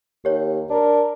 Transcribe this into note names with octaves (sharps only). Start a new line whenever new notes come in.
D#2 G4 C#5
D4 A#4